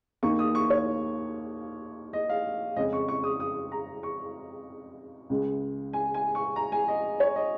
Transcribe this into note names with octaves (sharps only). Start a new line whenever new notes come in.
D#2 D#3 A#3 D#4 C#6
D#6
C#6
C#5
D#5
F5
F2 C#3 G#3 C#4 D#5
C#6
C#6
D#6
D#6
A#5
C#6
C#2 C#3 G#3
G#5
G#5
C#6
A#5
G#5
D#5
C#5
D#5